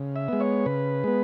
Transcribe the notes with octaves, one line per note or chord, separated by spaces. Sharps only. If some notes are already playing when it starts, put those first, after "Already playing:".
Already playing: C#3
E5
G#3 B3
C#5
C#3 B4
G#3 B3